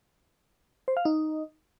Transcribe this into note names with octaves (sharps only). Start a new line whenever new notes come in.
C5
F5
D#4